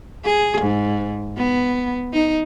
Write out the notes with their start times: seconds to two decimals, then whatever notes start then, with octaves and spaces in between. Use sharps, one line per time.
0.25 G#4
0.61 G#2
1.38 B3
2.13 D#4